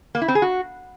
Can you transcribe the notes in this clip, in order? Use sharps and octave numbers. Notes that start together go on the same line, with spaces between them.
A#3
E4
C4
G#4
F#4